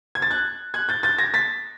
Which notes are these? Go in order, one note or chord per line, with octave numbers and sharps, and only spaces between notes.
G#6
A6
F#6 G#6
F#6 G#6
G6 A6
G6 A6
G#6 A#6
A6 B6